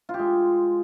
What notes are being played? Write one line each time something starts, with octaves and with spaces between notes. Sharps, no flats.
F4
G4
G#3